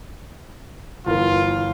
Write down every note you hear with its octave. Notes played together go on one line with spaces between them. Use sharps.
G1 E3 F4 A#4